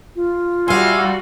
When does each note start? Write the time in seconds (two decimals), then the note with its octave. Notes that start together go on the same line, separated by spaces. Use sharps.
0.15 F4
0.68 G3 F#4 E5 F5 G#5 C6